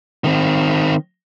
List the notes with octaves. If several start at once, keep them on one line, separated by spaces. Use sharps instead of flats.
D#3 C4